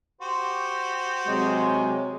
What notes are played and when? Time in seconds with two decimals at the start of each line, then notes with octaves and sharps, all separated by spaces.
0.21 F#4 G4 C5
1.27 C3 F#3 G#3